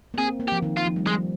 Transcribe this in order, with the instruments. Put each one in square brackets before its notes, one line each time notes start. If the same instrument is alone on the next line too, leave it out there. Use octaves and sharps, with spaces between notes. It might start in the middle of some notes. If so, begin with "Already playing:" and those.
[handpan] A#3
[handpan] C4 [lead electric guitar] G#4
[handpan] A#3
[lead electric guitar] G4
[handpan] F3
D#3
[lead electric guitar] F4
[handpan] F3
G3
[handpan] F3 [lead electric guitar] G#3